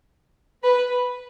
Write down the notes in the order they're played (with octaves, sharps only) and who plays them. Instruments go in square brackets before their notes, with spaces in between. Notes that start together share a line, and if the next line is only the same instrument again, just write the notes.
[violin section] B4